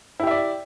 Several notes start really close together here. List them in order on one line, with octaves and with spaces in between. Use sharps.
E4 G4 E5 D5